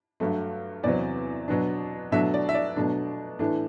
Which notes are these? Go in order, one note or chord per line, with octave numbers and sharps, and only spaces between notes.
G2 F#3 A3
E2 C3 F#3 C4 D5
B2 F#3 B3 D4
B2 F#3 A3 D4 E5
D5
E5
D5
B2 F#3 A3 D4
A2 E3 A3 D4